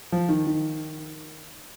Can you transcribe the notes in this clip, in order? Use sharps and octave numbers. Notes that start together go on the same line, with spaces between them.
F3
D#3
D#3